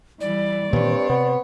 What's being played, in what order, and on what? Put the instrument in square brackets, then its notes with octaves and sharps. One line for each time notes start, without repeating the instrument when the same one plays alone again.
[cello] E3 G3 [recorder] D5
[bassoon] G2 [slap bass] A#2 D#3 E3 [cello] C4 C#5
[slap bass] C3 [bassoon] B3